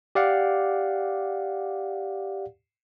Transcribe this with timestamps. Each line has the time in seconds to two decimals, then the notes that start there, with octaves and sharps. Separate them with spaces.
0.15 G4 D5 F5 F#5